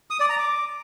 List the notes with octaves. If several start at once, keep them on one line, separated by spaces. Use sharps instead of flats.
D#6
D5
A#5
D6